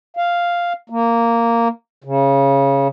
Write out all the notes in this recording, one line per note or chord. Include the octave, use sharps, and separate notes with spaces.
F5
A#3
C#3